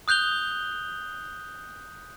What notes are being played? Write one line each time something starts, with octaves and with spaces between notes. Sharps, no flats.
D#6 F#6 G6 F7 G7